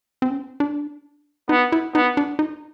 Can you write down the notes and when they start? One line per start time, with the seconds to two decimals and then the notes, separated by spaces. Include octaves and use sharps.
0.22 C4
0.30 C#4
0.60 D4
1.49 B3 D#4
1.72 E4
1.95 B3 D#4
2.17 D4
2.39 D#4